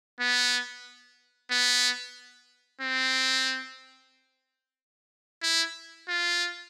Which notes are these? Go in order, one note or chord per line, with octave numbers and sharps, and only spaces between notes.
B3
B3
C4
E4
F4